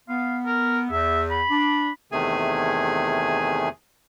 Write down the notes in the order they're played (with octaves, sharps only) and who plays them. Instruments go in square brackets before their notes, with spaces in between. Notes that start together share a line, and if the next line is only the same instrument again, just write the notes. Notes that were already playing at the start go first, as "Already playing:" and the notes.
[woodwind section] B3 [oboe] F5
[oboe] A#4
[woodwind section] E2 [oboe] E5
[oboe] B5
[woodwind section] D4
[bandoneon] E2 C3 D#3 A3 G#4 G#5